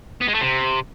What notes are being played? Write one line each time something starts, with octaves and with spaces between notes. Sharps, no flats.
B3
G#3
A3
C3